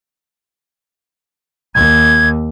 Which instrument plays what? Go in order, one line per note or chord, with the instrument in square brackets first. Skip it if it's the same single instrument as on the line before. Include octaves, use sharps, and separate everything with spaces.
[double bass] D#2 [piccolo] G#6